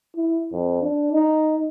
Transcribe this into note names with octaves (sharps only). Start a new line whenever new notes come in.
E4
F2
D4
D#4